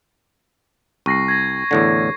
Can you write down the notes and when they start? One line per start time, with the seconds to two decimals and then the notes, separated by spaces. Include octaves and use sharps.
1.06 C2 C#6 A#6 C7
1.28 G#6 A#6
1.71 E2 A2 D3